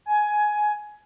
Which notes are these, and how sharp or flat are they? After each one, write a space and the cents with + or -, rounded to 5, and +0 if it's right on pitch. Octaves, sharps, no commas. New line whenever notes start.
G#5 +15